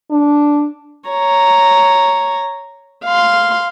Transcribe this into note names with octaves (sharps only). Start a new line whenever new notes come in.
D4
C#5 A#5
F5 C6